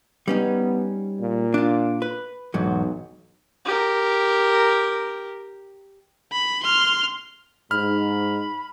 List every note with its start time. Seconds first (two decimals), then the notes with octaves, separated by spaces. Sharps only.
0.28 G3 B3 C#4 D#4
1.20 A#2
1.54 D4 F4
2.02 B4
2.54 B1 E2 G#2 F#3
3.65 G4 A#4
6.32 B5
6.64 C6 F6
7.71 G#2 B5 F6